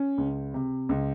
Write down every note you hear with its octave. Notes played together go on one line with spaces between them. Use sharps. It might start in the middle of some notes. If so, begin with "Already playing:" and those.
Already playing: C#4
C#2
C3
C#2